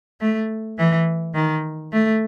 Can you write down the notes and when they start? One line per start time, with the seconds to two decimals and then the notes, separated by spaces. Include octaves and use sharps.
0.21 A3
0.78 E3
1.35 D#3
1.93 A3